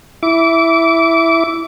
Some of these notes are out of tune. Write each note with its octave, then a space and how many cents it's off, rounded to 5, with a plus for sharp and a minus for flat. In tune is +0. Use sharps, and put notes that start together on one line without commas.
E4 +0 D6 -25